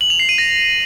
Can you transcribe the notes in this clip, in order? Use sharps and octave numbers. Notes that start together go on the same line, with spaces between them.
F#7
F7
C7
D#7
A#6